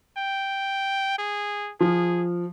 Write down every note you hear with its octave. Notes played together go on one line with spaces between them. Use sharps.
G5
G#4
F3 G#4